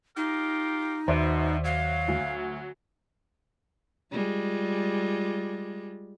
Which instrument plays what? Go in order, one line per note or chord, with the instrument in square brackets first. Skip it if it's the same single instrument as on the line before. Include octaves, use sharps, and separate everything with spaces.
[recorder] D#4 [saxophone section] F4 G4 A#4
[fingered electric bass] D#2 [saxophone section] B2 [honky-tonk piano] C5 D5 E5
[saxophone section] F#3 [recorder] F5
[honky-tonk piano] D2
[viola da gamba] G3 G#3 F4